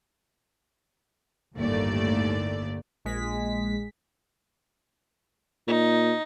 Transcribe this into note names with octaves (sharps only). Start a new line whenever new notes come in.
G1 D#2 A2 A3 D5
A#1 G#3 B6
A#2 D#4